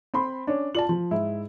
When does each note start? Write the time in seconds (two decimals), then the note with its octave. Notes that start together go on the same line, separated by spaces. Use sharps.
0.14 C4 B5 C6
0.47 C#4 D4
0.75 F4 D5 A5 F#7
0.89 F3
1.11 G#2 E4